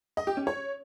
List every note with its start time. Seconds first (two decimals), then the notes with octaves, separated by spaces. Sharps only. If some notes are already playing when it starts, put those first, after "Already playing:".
0.17 D#5
0.27 G4
0.37 C#4
0.47 C#5